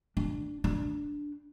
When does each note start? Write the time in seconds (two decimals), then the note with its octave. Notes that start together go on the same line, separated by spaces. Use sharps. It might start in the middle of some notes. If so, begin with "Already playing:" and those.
0.17 D4
0.64 D4